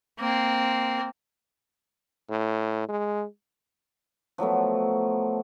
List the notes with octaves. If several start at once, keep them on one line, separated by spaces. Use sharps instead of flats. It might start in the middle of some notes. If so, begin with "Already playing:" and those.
A#3 C4
A2
G#3
F3 F#3 A3 B3